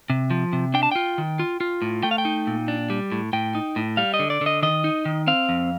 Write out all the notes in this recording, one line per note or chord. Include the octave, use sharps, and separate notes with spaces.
C3
F3
C3
D4 G5
A5
F4 G5
D#3
F4
F4
A2
A3 G5
F5
G5
D#4
A#2
D4
G3
A2
A2 G5
D#4
A2
G3 F5
D#5
D3
D5
D3 D#5
D#3 D#5
D#4
D#3
C4 F5
F2